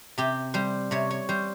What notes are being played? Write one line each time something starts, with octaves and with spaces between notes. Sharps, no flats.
C3 G4
G3 C5
C3 C#5
C#5
G3 C5